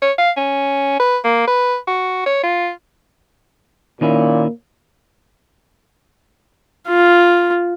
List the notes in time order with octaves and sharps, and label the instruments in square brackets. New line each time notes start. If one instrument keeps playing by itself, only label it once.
[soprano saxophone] C#5
F5
C#4
B4
A#3
B4
F#4
C#5
F4
[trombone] A#2 [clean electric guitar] D#3 C#4 E4 [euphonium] A#3
[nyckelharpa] F4